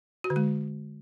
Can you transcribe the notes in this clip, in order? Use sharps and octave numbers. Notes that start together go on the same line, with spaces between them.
F#4
D3
G#3